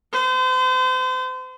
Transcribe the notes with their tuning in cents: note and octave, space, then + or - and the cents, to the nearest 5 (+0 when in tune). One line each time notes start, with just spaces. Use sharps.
C5 -40